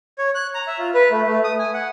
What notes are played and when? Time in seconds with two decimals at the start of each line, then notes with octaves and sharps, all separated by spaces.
0.18 C#5
0.35 F#6
0.54 A#5
0.67 E5
0.79 F4
0.94 B4
1.11 A3
1.27 A3
1.44 D#6
1.59 G#5
1.74 F#5